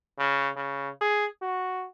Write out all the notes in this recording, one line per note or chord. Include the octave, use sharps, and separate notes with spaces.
C#3
C#3
G#4
F#4